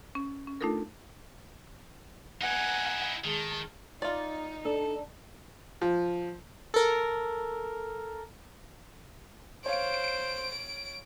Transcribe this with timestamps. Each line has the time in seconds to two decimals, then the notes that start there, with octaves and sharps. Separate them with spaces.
0.15 C#4
0.47 C#4
0.61 A3 D4 D#4 F4 A4 A#4
2.42 D#4 E4 F#5 G#5
3.24 D#3 G#3 A5
4.02 D#4 F4 D5
4.65 D4 A4
5.82 F3
6.74 A4 A#4
9.66 C5 C#5 F5 D7